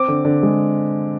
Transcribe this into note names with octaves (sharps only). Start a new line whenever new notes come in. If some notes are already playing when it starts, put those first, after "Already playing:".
Already playing: C4 D6
D3
D3
G#3